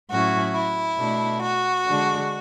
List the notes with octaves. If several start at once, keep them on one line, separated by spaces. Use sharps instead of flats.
A2 F#3 C#4 E4 F#4
E4
B2 A3 D4
F#4
D3 G#3 D4